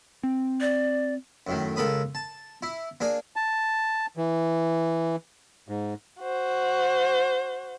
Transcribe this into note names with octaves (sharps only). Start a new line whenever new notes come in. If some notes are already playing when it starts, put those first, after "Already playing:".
C4
D5
F#2 A2 D#3
C#2 A4 A#4 B5 D#6
A5
E4
A#3 D4 G#4
A5
E3
G#2
F#4 C5